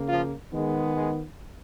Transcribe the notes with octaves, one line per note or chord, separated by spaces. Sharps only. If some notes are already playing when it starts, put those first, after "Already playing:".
Already playing: C#3 A#3
F3 F4
D#3 G#3 B3
G#3 G#4